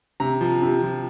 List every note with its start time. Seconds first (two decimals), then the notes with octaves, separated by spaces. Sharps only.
0.20 C3 A#5
0.41 F3
0.62 C3
0.82 F3